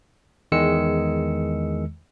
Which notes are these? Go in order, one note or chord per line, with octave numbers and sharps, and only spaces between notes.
E2 D#3 G#3 E6 C#7